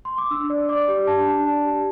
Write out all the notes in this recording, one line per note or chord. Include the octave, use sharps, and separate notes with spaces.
C6
D6
D4 E6
D5
D5 D6
G4
D4 A5
D4
D5 A5
G4